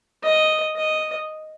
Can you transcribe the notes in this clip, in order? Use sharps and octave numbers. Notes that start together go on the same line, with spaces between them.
D#5
D#5